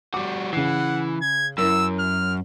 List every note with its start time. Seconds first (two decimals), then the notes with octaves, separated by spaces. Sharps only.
0.14 G3 F#4 D6
0.53 C#3 E3 F#5 C7
1.22 G#6
1.58 F#2 E4 A#4 E6
1.99 F6